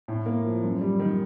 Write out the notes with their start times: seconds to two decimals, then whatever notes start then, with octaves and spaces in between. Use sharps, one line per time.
0.08 A2
0.26 A#3
0.45 F3
0.63 F#2
0.81 G3
0.99 D#3